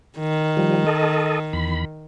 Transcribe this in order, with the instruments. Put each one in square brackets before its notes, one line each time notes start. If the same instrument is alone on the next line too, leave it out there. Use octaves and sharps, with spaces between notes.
[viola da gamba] D#3
[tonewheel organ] F3 G3
A4 D#5
E2 B5